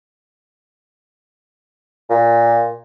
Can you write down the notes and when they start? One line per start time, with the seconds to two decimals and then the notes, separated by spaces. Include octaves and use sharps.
2.10 A#2